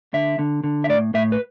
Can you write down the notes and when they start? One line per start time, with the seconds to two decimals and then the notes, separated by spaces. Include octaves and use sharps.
0.13 D3 E5
0.39 D3
0.64 D3
0.84 E5
0.89 A2 D5
1.14 A2 E5
1.32 B4